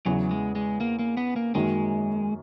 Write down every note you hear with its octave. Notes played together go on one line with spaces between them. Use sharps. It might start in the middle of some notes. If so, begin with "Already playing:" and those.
E2 C#3 E3 F#3
G#3
G#3
A#3
A#3
B3
A#3
F#2 D#3 F#3 G#3 A#3